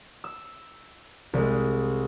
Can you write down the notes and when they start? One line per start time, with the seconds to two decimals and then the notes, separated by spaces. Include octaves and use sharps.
0.24 E6
1.33 C2 G#3